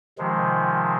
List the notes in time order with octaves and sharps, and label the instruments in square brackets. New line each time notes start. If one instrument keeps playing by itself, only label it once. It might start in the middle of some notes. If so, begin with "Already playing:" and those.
[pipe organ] C3 D#3 F3 G#3